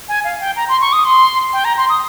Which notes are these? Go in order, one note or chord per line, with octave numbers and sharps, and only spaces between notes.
G#5
F5
G5
A#5
C6
C#6
D#6
C6
G5
A#5
C6
D#6